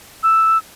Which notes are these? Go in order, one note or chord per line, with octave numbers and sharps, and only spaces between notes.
E6